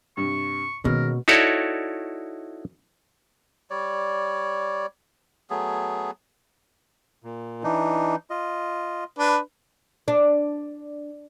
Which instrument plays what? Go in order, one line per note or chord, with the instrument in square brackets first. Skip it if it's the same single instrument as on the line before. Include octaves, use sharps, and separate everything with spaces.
[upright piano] G2 C3 [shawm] C#6
[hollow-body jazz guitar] B2 [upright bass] D#3 [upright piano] G#3 A#3 C#4 [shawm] A#4
[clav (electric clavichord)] D#4 E4 F#4 A4 C#5 D5
[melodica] G3 C#5 D5
F#3 A3 B3 G#4
[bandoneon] A#2
E3 D4 D#4
F4 D#5
[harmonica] D4 B4
[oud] D4